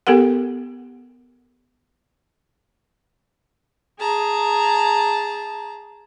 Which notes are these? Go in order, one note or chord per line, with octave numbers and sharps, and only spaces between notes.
B3 G4 A4 A#4 F#5
G#4 A5 A#5